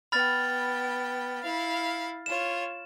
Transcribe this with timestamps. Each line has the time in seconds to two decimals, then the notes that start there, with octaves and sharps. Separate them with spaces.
0.12 B3 G5 B5 F6 A6
1.42 E4 F5
2.26 F4 C#5 E7